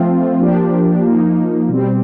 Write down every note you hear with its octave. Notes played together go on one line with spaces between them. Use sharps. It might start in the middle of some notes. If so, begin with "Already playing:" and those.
Already playing: F3 A3 C4 F4
F3 A#3 D4 G4
F3 A#3 D#4
B2 G3 C4